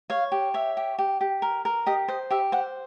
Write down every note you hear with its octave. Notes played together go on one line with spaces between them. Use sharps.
C#5 F5
G4
C#5 E5
G4
G4
G4
A#4
A#4
G4 D#5
C5 D#5
G4 E5
C5 F#5